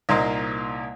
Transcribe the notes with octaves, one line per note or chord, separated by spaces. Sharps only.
C2 A#2 A#3 D#4 C5 D#5